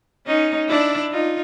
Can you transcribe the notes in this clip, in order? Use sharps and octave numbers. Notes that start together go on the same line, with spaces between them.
C#4 D#4
D4 E4
D#4 F4